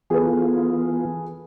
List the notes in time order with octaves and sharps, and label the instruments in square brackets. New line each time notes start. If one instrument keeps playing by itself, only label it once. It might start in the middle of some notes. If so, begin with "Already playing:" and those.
[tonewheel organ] E3 B3 F4 [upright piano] G#4 A4 B4